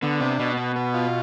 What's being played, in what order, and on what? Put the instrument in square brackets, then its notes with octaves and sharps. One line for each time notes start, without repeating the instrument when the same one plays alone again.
[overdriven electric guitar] D3 [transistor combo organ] B3
[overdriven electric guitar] C3 [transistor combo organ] D4
[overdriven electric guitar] B2 [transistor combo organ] B3
[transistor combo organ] B3
B3
F4